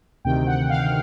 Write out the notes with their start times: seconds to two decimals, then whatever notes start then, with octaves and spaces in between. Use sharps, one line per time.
0.25 D2 C3 D#3 G5
0.47 F#5
0.70 F5